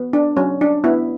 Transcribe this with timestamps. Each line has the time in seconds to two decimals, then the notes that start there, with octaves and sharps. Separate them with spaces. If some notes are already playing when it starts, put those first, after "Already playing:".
Already playing: B3
0.13 D4
0.37 F#3 C#4
0.61 D4
0.84 B3 E4